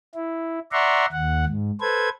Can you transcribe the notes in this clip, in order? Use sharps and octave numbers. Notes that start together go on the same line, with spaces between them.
E4
D5 E5 F#5 A#5 C6 C#6
D#2 F#5
G#2
A4 B4 C5 G#6